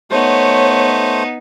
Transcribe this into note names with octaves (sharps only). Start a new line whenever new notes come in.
A3 B3 D#4 C5 C#5